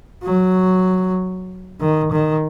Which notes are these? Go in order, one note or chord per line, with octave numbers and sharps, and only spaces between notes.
F#3
D#3
D#3